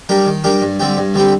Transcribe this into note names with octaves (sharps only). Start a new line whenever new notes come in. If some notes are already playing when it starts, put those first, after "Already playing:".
G3 D4 G4 A#4
D#3
G3 D4 G4 A#4
G2
D3 G3 C4 G4
G2
D3 G3 C4 G4